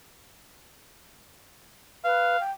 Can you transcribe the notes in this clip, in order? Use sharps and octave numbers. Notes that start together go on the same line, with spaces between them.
B4 F5
G5